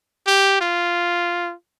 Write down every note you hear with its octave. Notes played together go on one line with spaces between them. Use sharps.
G4
F4